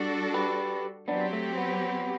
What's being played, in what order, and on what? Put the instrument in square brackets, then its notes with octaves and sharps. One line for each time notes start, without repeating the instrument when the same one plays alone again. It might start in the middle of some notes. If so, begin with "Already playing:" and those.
Already playing: [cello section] G3 D4 F#4 A4
[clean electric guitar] G4 B4
[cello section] F#3 C4 G4 [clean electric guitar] B3 D4
[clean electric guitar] A3
B3